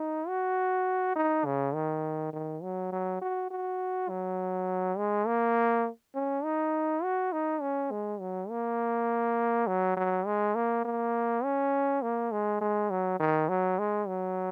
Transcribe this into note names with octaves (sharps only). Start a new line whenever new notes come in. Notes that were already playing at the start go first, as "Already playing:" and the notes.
Already playing: D#4
F#4
D#4
C#3
D#3
D#3
F#3
F#3
F#4
F#4
F#3
G#3
A#3
C#4
D#4
F#4
D#4
C#4
G#3
F#3
A#3
F#3
F#3
G#3
A#3
A#3
C#4
A#3
G#3
G#3
F#3
D#3
F#3
G#3
F#3